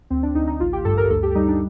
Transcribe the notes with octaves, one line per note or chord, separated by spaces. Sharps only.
D2 C4
D4
D2 D#4
D#4
A1 F4
G4
G2 A4
A#4
D2 A4
G4
G3 D#4
D4